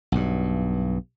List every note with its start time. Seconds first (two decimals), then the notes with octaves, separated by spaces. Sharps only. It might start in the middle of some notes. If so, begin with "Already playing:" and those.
0.12 B1 G2